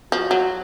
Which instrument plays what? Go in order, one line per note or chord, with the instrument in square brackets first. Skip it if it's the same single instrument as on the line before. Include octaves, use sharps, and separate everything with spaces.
[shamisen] F3 [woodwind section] F#4
[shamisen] F#3